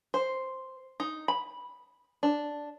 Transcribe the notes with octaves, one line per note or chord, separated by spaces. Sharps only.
C5
D#4
B5
D4